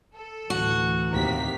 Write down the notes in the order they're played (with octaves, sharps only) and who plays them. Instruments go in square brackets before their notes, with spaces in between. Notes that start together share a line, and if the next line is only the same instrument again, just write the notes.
[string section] A4
[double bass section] D2 A2 E3 [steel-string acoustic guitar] F#4
[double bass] D#2 [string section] C3 A#4 B6